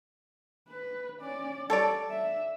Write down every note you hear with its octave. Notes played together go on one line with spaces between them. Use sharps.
B4
C#4 D5
G3 A4 C#5 D5
E5